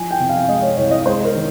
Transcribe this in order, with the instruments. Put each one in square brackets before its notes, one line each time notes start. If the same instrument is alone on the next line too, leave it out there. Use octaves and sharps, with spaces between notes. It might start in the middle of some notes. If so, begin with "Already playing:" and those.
Already playing: [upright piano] F3 G#5
G5
C3
F5
G#3 D#5
C#5
C2 C#5
D#5
G#3 C5
A#4
D#3